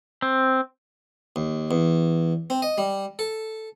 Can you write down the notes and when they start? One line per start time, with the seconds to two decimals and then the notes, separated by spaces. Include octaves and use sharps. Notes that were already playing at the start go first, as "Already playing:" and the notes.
0.22 C4
1.36 D#2
1.71 E2
2.50 C4
2.62 D#5
2.78 G3
3.19 A4